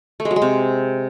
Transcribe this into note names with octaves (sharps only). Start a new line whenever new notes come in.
A3
G#3
F#3
G#3
C3